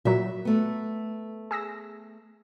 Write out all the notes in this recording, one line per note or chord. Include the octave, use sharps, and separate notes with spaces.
A#2 F#3 E5
A3 B3
G#4 E6 A#6